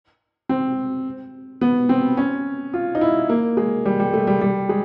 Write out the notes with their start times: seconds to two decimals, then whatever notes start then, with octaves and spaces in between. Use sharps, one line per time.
0.49 C4
1.61 B3
1.89 C4
2.17 C#4
2.74 F4
2.95 D#4
3.01 E4
3.29 A#3
3.57 G#3
3.85 G3
4.00 G3
4.13 A3
4.27 G3
4.41 G3
4.69 G#3